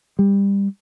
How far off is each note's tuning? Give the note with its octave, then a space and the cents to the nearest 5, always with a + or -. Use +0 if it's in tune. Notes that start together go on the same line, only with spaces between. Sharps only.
G3 +20